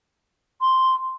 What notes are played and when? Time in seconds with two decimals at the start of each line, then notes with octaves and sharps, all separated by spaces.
0.61 C6